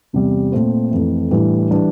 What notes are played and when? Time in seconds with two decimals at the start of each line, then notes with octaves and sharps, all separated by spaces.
0.13 E2 C3 G3
0.52 A#2 A3 C4
0.92 F2 E3 A3
1.31 A2 E3 G3 D4
1.71 E3 G3 D4